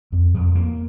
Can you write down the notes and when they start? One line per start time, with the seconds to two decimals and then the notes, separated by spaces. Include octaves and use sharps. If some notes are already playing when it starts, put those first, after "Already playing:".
0.12 F2
0.34 F2
0.55 A#3